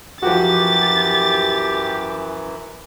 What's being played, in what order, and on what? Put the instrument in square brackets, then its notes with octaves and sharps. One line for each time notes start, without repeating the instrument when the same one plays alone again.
[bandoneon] F#2 E3 [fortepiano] F3 F#4 [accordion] G4 [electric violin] A6